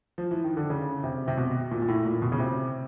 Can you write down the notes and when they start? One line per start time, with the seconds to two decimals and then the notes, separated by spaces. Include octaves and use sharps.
0.18 F3
0.31 E3
0.44 D#3
0.57 D3
0.70 C#3
1.04 C3
1.28 C3
1.37 B2
1.71 A#2
1.82 A#2
1.88 A2
2.05 A#2
2.22 B2
2.32 C#3
2.39 C3